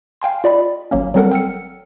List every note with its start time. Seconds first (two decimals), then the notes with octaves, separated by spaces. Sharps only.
0.22 F5 G5 G#5 C6
0.44 F4 D5 D#5 B5
0.91 G#1 F#3 A#3 C#4
1.14 F#3 G3 C4 A4 A#4 F#5
1.31 G5 E6 F6 C#7